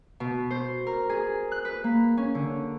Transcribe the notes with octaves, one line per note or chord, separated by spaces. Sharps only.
B2
C5
A#4
G#4
F#6
B4
A#3
C#4
D3